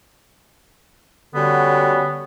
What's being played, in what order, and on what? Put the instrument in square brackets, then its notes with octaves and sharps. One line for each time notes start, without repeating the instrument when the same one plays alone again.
[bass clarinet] D3 [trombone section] G3 C#4 F#4 [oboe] B3